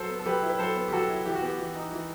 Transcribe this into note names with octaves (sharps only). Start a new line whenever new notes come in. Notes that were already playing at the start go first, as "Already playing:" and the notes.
Already playing: F#3 A4 C5
B3
A4
F#3 G4 B4
E4
B4
F#3 A4 C5
B3
G4
F#3 F#4 A4
E4
E3 G4
F#4
B3 G4
E3
D#4
E3